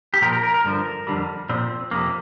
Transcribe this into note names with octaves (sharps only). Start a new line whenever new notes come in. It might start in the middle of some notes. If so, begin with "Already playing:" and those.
G4
A#2 F3 A#4
A#4
A#4
A#4
G2 D3 F3
F2 D3 G3
A#2 F3 C4
F2 C3 F3 A#3